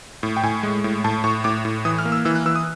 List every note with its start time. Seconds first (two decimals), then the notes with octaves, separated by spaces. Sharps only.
0.23 A2
0.37 G5
0.43 A2 G#5
0.63 G#3
0.84 A2
1.04 A2 A5
1.24 A2 C#6
1.44 A2 D6
1.65 A2
1.85 E3 D#6
1.99 F6
2.05 A#3
2.12 E6
2.25 E3 E6
2.36 F#6
2.46 E3 E6
2.56 D#6